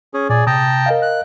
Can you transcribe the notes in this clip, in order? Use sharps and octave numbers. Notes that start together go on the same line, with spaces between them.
C#4 G#4
A#2 G#4 D5
C3 G5 A5 A#5 D#6
A#4 D#5 F5
F#6